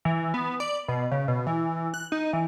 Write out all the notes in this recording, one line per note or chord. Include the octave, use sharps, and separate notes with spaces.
E3
B3
D5
B2
C#3
B2
E3
F#6
D#4
E3